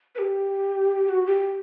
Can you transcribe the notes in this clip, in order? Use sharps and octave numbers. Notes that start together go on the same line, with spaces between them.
B4
G4
G4
F#4
G4